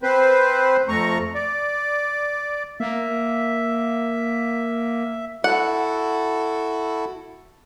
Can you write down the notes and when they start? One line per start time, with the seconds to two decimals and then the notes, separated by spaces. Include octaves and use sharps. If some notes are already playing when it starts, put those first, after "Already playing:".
0.03 C4 B4 C5
0.88 F2 A3 A#5 C#6
1.35 D5
2.80 A#3 E5
5.44 E4 F#4 A4 F#5